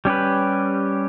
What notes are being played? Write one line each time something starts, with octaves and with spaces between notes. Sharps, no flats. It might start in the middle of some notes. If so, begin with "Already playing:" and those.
G3 C#4 G4 B4